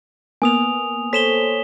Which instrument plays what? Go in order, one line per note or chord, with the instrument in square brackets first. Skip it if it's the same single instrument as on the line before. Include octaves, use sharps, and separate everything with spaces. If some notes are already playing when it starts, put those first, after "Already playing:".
[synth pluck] A#3 B3 [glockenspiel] G#5 D#6 F7
[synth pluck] A4 C5 C#5 [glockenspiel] B6 E7 G7